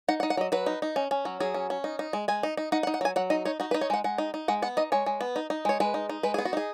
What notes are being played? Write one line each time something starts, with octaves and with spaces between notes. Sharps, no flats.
D#4 F#5
F#5
D#4
F#5
F#3 D#5
F#3 B4
D#4
D#4
C#4
C#4
F#3
F#3 G#4
C#4
C#4
D#4
D#4
G#3
G#3 G#5
D#4
D#4
D#4 F#5
F#5
D#4
F#5
F#3 G#5
F#3 F#5
D#4 D#5
D#4 C#5
D#4 F#4
B4
D#4
C#5
G#3 F#5
G#3 F#5
D#4
D#4
G#3 F#5
B3 F#5
D#4 D#5
G#3 C#5
G#3
B3
D#4
D#4
G#3 C#5
G#3 B4
D#4
D#4
G#3 B4
B3 G#4
F#4
D#4 G#4